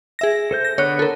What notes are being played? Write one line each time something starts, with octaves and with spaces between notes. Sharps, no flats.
G#4 E5 A#6
A4 C5 G6
A#6
D3 B3 C#5 F#6
A4 A#4